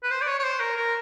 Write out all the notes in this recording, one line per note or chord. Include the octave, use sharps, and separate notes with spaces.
B4
C5
D5
C#5
C#5
C5
A#4
A#4